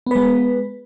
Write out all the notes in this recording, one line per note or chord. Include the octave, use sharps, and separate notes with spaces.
G#3 B3 B4